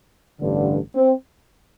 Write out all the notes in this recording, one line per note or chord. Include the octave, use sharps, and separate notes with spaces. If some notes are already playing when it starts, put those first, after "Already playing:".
A1 G2 D3
C4